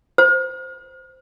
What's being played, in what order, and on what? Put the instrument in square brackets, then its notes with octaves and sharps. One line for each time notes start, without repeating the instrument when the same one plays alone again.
[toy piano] C5